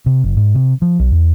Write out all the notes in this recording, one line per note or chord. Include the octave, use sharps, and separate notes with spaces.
C3
F#1
G#2
C3
F3
B1
E2